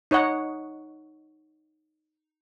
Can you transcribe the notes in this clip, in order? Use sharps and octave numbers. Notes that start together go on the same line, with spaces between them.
D#4 C#5 D#5 F#5